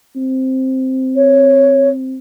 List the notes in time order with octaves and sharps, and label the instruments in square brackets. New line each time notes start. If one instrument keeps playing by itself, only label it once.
[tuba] C4
[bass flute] C#5